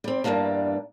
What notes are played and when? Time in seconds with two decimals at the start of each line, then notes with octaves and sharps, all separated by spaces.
0.04 G3 C4
0.24 E2 G2 F3 G3 A#3 D4